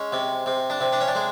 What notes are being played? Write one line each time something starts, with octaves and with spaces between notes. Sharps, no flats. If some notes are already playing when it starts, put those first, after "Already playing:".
Already playing: G#3 C#4
C3
C3
D4
C3
D4
C#4
D4
G#3